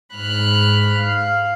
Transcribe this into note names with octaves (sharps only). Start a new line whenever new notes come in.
G#2 B5 F6 F#6
F5